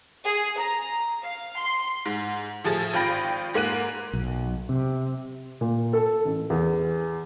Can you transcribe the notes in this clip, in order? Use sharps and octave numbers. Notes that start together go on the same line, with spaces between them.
G#4
A#5
F5
C6
G#2
A2 F3 G#4 A6
G#1 F4 G5 B5 A#6 D7
G#2 A#3 F#6 D#7
B1
C3
A#2
A4
A1
E2